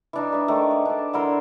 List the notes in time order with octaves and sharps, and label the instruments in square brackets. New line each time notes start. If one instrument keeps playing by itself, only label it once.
[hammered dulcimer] E3 D4 D#4
D4 G#4 B4
D#3 A3
G#4
D4 A4
D3 E4 A#4 C6